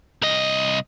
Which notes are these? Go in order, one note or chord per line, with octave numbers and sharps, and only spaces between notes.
C2 D#5